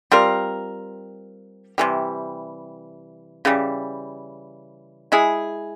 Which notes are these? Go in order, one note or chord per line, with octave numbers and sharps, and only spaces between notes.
G3 C4 F4 A#4
C3 E3 G3
C#3 E3 G3
G#3 E4 G#4